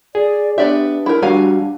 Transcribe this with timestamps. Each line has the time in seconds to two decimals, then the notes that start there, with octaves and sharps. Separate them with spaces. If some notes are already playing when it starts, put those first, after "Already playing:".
0.15 G#4 D5
0.58 B3 D4 G4 D5 E5
1.06 E4 A#4
1.22 G3 D4 F#4 G4 F5 G#5 A#5